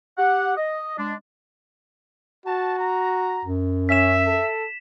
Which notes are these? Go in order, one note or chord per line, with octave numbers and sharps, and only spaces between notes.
G4 F#5
D#5
G#3 D4
F#4 A5
A#5
F#2
C#4 E5 B6 E7
A4